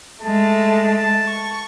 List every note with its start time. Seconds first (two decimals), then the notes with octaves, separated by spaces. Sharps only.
0.21 G#3 A3 A5
1.26 C#6